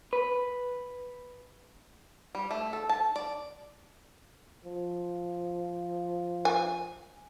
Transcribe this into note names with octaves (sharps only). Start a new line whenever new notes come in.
B4
G3
A3
A4
A5
D5
F3
G#5